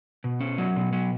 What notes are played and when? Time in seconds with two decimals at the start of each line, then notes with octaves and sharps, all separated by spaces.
0.24 B2
0.40 C#4
0.58 F#3
0.76 B2
0.93 F#3